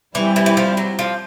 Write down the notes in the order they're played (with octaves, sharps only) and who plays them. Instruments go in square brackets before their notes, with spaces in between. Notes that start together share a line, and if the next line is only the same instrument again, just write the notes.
[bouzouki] E3 [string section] G3 C4 E4 G4
[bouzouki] E3
E3
F3
F#3
F3